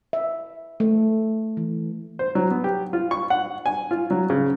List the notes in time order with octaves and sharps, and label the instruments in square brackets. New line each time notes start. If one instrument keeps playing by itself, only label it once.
[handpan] E5
A3
E3
[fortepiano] C5
F#3
B3
G4
F4
C#6
F#5
G#5
F4
F#3
C#3